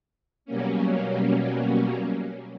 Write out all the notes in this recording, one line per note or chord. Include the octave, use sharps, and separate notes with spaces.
B2 F#3 G3 A#3 C#4